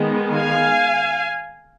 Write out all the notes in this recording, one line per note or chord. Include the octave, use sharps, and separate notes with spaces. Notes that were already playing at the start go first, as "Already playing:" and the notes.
Already playing: D#3 G#3 B3
F5 G#5